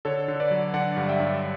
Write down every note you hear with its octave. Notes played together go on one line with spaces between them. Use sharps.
D3 A4 C#5
D3
B4 D5
F#3
D3 D5 F#5
G2
E5 G5
G2